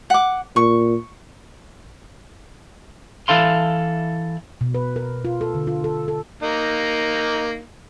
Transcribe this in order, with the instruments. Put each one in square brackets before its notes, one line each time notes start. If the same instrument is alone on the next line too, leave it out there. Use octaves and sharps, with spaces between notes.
[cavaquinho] F#5 D6
[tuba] A#2 [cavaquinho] C#6
[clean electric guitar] E3 E4 A4 F5 C6
[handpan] B2
B4
A#4
F4
A4
D3
F4
A4
A4
[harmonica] A#3 D#4